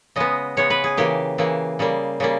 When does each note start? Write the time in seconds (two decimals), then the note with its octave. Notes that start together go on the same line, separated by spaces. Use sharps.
0.16 C#3 G#3 B3 D#5
0.57 C#3 G#3 B3 C#5
0.70 B4
0.84 G#4
0.97 C#3 E3 A#3 G4
1.38 C#3 E3 A#3
1.79 C#3 G3 A#3
2.20 C#3 G3 A#3